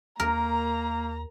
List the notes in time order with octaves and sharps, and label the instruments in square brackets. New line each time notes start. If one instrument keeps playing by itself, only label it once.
[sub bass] D#2 [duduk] A#3 [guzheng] A#4 [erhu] A#5